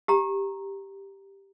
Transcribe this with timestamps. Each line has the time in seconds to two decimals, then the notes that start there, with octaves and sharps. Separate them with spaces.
0.08 G4 A#5